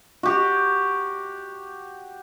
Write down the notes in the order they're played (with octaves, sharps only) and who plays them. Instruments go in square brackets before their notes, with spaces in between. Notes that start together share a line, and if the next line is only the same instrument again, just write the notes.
[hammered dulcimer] F#4 G4